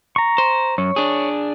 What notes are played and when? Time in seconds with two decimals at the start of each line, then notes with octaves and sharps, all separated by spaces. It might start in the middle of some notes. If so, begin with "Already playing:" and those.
0.16 A#5 C#6
0.38 C5
0.78 F#2 C#5
0.96 D4 G#4